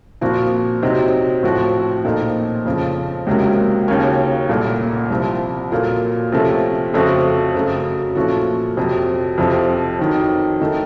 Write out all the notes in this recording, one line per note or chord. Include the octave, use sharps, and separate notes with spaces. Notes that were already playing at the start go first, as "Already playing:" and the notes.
A#2 F3 C4 F#4
C3 F#3 C4 D#4
A2 F3 C4 F#4
A#2 F3 C4 D#4 A4
F2 C#3 F3
C#2 C3 F#3 A#3 C#4
D#2 C#3 F#3 A#3 C#4
C2 A#2 A3
C2 C3 F3 C4
A#2 F#3 A#3 F4 A4
C3 F3 A3 C#4
F2 C#3 A3 C4 F#4
F#2 C#3 F#3 A3
A#2 F3 A3 C#4 F#4
F2 C3 F#3
F2 C3 F3
F2 D#3 F#3
D#3 A3 D#4